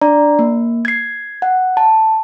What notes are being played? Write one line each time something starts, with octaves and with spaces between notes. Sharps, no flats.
D4 D5 A#5
A#3
G#6 C7
F#5
A5